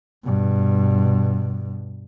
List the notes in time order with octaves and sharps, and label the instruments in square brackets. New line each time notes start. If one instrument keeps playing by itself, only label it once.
[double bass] G2 B2